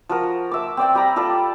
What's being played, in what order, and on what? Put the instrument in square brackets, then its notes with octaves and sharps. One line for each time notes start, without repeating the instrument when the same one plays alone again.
[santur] F3 F#4 A#4
E5 D6
C4 D5 G5
G3 G4 A#5 B5
F4 A4 D5